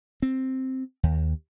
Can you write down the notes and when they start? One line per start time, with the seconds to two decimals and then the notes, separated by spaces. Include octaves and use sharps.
0.22 C4
1.03 D#2